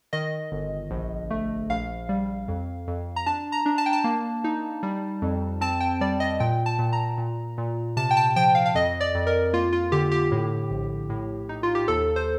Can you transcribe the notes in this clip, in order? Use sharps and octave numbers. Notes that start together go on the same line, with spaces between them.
D#3 D#5
G1
A#1
A3
A#1 F5
G3
F2
F2
A#5
D4 A5
A#5
D4
A5
G5
A5
A#3
D#4
G3
F2
C4 A5
G5
G3 D5
D#5
A#2 G5
A5
A#2
A#5
A#2
A#2
C3 A5
G5
A5
F3 G5
F5
F5
F2 D#5
D5
F2
A#4
A#3 F4
F4
D3 G4
G4
A2
A#1
A2
D#4
F4
G4
D#2 A4
C5